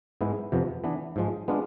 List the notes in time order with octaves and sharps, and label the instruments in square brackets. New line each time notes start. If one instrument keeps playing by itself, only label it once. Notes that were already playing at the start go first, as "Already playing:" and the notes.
[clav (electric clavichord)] G#2 G#3 B3 E4
F2 C3 F3 B3
E3 B3 D4
G#2 F3 G#3
G#3 B3 D4 F4